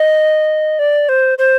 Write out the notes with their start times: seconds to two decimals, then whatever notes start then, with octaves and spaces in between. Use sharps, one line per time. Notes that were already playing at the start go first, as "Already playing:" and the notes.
Already playing: D#5
0.79 D5
1.09 C5
1.38 C5